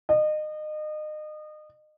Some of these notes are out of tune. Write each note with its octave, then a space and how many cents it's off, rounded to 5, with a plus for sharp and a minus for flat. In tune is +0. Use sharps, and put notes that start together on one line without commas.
D#5 -30